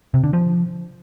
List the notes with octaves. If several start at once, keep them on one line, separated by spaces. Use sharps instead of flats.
C3
D3
F3